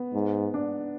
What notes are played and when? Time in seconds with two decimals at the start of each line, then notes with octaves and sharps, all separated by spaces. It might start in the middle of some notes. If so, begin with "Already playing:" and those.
Already playing: B3
0.14 G#2
0.54 D4